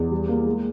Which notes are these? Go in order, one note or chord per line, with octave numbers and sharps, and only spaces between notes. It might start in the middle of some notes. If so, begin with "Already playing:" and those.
Already playing: E2
G3
A#3
G#3